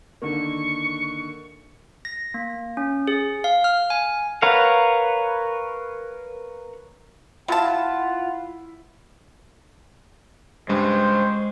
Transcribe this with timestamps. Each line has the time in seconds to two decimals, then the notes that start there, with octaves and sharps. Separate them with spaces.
0.22 D3 D#3 A#3 C#6
2.05 A#6
2.34 A#3
2.77 C#4
3.08 G#4
3.44 F5
3.64 F6
3.90 G#5
4.42 A#4 B4 C#5 F5 F#5
7.48 F#3 E4 F4 F#5 A5 B5
10.69 C#2 G2 G#3 C5